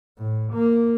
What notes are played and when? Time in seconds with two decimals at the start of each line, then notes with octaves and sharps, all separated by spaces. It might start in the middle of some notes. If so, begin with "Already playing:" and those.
0.18 A2
0.53 A#3